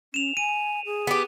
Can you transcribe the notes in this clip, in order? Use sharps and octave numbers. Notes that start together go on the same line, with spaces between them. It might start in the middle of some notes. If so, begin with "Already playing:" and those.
C#4 E7 F7
G#5 D#7
G#4
B3 G4